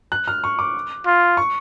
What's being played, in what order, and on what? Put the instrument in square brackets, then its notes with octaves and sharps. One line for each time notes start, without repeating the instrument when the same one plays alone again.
[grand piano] F#6
F6
C#6
D6
[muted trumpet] F4
[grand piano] C#6